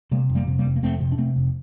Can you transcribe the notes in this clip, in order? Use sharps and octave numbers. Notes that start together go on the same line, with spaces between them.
C3 G3 A#3
F1
G3 A#3
C3
G3 A#3
F1
A#3
F1 A3 C4
C3
D4
C3 A3 C4
F1